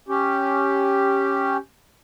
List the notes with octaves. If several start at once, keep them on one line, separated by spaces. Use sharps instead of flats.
C#4 G4